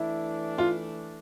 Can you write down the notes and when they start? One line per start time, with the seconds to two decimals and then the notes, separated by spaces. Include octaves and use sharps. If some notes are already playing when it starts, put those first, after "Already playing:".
Already playing: E3 A3 D4 E4
0.58 F4